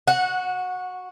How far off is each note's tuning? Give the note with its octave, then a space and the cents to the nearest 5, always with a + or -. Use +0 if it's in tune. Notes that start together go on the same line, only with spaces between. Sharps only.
F#4 +0 F#5 -20